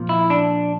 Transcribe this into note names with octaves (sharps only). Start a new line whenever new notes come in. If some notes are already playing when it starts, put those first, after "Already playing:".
Already playing: A#2 F3
E4
D4